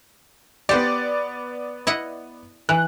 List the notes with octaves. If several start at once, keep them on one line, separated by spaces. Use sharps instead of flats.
B3 G4 C5 D5
E4 D#5 F#5
E3 F#6